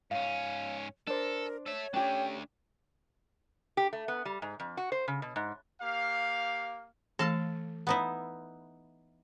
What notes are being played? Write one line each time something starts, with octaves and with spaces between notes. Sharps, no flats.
G#2 C#4 C#5 F5
D4 A4 A#4 C5
A4 C#5 E5
A3 C#4 D4 G4 G5
G4
A3
B3
G3
G#2
F2
F#4
C5
C#3
B2
G#2
A#3 G4 F5
E3 A3 A4 F5 A5
B3 D#4 E4